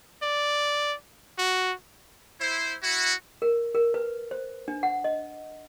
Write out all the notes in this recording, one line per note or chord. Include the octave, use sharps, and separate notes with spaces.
D5
F#4
E4 C5
E4 F#4
A#4
A#4
B4
C5
D4
F#5
D#5